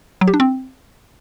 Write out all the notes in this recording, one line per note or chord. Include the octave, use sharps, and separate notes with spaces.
F#3
G4
D4
C4